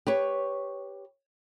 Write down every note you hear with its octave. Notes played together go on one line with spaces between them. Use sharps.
G4 B4 C#5